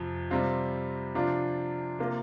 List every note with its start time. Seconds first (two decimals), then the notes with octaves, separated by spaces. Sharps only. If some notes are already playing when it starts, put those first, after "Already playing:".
Already playing: F2 C3 F3
0.31 C3 G3 C4 F4
1.15 C3 F3 D4 F4
1.99 C3 A#3 F4